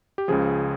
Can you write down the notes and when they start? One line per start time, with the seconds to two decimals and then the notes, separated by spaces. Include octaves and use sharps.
0.18 G4
0.28 C#2 C#3 F3 G#4